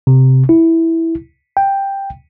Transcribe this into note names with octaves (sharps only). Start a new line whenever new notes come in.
C3
E4
G5